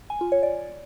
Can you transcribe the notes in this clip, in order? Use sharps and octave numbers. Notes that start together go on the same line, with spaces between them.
G#5
F4
C#5
D5